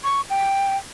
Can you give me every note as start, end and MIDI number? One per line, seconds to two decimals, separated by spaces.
0.04 0.21 85
0.30 0.77 79